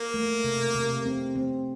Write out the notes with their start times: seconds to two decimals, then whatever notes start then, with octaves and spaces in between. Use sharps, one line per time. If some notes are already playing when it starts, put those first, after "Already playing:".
Already playing: A#3
0.14 A3
0.44 C3
0.75 C3
1.06 C4
1.36 C4